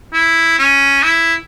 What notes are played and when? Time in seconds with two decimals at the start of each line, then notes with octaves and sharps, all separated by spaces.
0.13 E4
0.59 C#4
1.03 E4